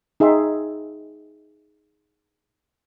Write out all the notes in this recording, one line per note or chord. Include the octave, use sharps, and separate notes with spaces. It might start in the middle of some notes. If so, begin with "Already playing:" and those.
D#4 G#4 E5 G5 C6